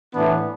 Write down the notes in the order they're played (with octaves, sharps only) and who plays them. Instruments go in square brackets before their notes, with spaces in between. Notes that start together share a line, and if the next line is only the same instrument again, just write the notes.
[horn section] A2 E3 B3 D4